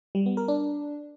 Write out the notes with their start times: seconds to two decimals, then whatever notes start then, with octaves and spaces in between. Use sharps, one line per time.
0.15 G3
0.26 B3
0.37 A#4
0.48 D4